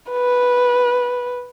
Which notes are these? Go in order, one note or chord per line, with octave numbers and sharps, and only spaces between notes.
B4